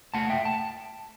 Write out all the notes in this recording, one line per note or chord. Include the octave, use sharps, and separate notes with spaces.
A3 F#5 A5
E5 G5
A5